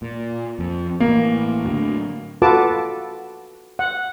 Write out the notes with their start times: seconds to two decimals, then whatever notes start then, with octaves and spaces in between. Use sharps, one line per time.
0.02 A#2
0.59 F2
1.00 A1 A#3
1.65 A2 D3 F#3
2.42 F4 F#4 A4 B4 A5 D6
3.79 F#5